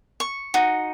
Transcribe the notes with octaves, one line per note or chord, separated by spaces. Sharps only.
C#6
D#4 F#4